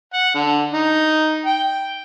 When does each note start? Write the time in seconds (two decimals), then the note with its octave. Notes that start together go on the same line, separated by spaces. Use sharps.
0.14 F#5
0.34 D3
0.73 D#4
1.46 G5